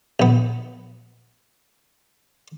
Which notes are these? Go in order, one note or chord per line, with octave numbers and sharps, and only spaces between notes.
A#1 B3